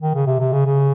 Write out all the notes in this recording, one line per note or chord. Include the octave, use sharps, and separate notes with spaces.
D#3
C#3
C3
C3
C#3
C#3